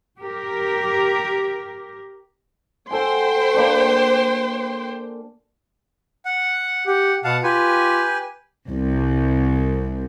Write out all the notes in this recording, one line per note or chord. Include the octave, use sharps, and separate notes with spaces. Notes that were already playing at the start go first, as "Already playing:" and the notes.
G4 A#4
F#4 A4 C5 G5 G#5 C6
A#3 D4 C#6
F#5
G4 F#5
B2 F5 F#5 A5
F4 G4 B4 G#5
C2